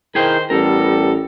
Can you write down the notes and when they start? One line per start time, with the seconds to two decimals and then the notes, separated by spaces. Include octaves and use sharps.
0.15 D#3 E4 G#4 A#4 C5 G5
0.50 A1 G3 B3 A4 A#4